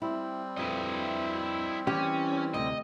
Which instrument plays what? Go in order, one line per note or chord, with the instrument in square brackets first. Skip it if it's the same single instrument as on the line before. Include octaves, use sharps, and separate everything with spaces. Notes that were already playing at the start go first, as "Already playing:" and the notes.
[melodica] G3 C4 [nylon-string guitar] E4
[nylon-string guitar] F2 G4 B4 [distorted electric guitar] E4 D#5
[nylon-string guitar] E3 [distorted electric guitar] C#4 [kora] G4
[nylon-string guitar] D2 C3 [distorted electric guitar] D#5